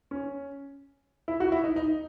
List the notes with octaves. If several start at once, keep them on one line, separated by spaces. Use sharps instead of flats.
C#4
E4
F#4
E4
D#4
D#4